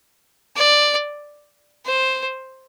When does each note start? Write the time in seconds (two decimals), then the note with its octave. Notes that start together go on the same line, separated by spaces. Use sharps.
0.56 D5
1.85 C5